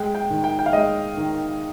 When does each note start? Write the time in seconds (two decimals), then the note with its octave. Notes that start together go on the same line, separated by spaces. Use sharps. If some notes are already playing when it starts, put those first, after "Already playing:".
Already playing: G#3 G5
0.15 G5
0.30 D#3
0.44 G5
0.59 G5
0.66 F5
0.73 G#3 D#5
1.17 D#3